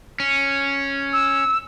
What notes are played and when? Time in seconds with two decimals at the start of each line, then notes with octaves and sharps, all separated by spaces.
0.20 C#4
1.13 E6